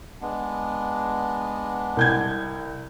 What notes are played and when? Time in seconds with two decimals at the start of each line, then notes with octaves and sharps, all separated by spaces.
0.21 G#3 B3 D4
1.97 C2 G6 G#6